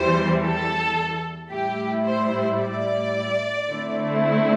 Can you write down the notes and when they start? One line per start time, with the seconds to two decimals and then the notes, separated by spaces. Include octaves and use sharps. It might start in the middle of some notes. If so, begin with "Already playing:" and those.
Already playing: E2 E3 G3 C5
0.43 A4
1.50 A2 G3 E4 G4
2.05 C5
2.60 D5
3.68 D3 A3 C4 E4